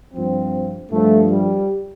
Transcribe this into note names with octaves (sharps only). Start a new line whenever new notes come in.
G2 F3 C4
G2 F3 A3
G3